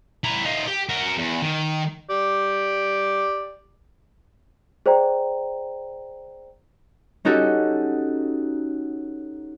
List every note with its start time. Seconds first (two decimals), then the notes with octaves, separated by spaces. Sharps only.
0.24 E4 A#4
0.45 D#4 F4
0.67 G4
0.89 F#4 A#4
1.17 E2
1.42 D#3
2.10 G4 D5
4.86 G#4 C5 D5 G5 A#5
7.25 C#4 D#4 F#4 G4 A4